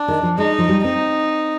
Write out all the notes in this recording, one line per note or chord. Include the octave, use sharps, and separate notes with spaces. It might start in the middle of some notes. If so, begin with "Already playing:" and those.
Already playing: D4
D#3
F3
G#3 D#4
F3
G3
C4 D#4